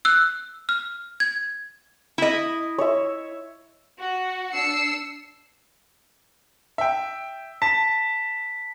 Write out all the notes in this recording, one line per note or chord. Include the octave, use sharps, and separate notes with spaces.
E6 F#6
F6
G#6
E4 D#5
C#5 E5
F#4
D4 E6 C7 C#7
E5 G5
A5 B6